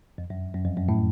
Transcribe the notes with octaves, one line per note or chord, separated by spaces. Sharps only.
F2
F#2
F#2
F2
F#2
A2